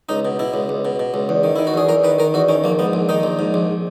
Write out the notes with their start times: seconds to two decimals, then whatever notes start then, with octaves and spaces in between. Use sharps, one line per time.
0.09 C#2 D#4
0.25 B2
0.39 B2 E4
0.54 C#2
0.69 C#2
0.85 B2
0.99 B2
1.14 C#2
1.29 E2
1.44 D#3
1.56 D#3 E4
1.67 F#4
1.74 E2 G#4
1.89 E2 A#4
2.04 D#3 B4
2.19 D#3 A#4
2.34 E2 F#4
2.49 D#3 C#4
2.64 A#1 A#3
2.79 G#2 B3
2.93 A#1
3.09 D#3 D#4
3.23 A#1
3.39 G#2
3.54 A#1